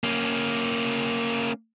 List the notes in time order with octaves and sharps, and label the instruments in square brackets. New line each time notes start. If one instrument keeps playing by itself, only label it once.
[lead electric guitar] A#3 C#4